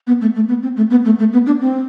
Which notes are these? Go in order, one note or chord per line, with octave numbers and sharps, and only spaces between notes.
B3
A3
A3
B3
C4
A3
B3
A3
A3
B3
D4
C4